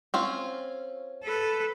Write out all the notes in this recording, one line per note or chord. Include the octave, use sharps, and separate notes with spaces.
C4 C#4 F4
A4 B4